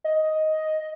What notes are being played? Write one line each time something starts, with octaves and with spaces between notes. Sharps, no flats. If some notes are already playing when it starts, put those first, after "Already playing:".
D#5